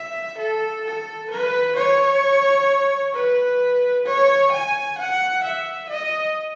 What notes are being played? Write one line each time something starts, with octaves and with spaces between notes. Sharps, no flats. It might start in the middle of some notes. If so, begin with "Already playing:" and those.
Already playing: E5
A4
A4
B4
C#5
B4
C#5
G#5
F#5
E5
D#5